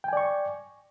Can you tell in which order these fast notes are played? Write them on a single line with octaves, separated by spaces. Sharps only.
G5 G#5 D5 C#6